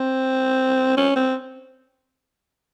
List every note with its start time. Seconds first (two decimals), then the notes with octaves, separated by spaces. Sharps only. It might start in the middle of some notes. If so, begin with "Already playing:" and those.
Already playing: C4
0.97 C#4
1.16 C4